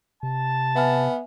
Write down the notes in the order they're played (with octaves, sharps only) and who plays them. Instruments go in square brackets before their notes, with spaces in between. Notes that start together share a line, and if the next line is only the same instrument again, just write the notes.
[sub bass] C3 [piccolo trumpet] A5
[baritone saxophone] B3 [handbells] E5 G#5 F6